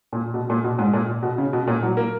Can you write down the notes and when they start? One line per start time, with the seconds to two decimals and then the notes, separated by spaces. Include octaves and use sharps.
0.13 A#2
0.34 B2
0.50 A#2
0.64 B2
0.79 G#2
0.93 A#2
1.23 B2
1.38 C#3
1.53 B2
1.67 A#2
1.83 F#3
1.97 A#3